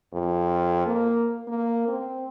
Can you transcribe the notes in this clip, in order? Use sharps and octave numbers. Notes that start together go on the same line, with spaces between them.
F2
A#3
A#3
C4